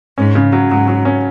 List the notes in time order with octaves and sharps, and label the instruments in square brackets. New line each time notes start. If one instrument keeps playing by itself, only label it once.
[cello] G#2 [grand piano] C#4
[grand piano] C#3
F#3
[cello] G#2 [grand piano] F#3
[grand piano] F#3
C#4